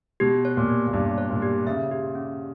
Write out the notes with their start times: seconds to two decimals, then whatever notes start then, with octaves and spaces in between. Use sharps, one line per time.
0.20 B2 G4
0.45 C#5
0.57 A#2
0.69 G4
0.87 A#2
0.93 G2 G4
1.18 C#5
1.30 A#2
1.42 G4
1.66 C#3 E5
1.91 G4
2.15 C#4